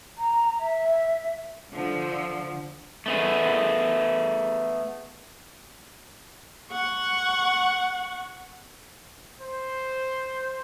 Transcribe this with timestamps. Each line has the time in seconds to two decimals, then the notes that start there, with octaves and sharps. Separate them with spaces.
0.17 A#5
0.59 E5
1.73 D3 F3
3.06 A3 B3 G#4
6.71 F#5 C#6
9.41 C5